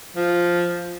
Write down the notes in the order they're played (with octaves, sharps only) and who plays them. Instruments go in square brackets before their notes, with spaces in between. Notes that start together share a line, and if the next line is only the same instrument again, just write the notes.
[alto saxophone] F3